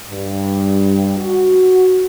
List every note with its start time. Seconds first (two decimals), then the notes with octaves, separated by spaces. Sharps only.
0.11 G2
1.18 F#4